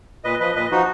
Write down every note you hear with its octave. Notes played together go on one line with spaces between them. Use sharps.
A#2 B4 D#5
F3 B4 D#5
A#2 B4 D#5
F3 D#4 F#4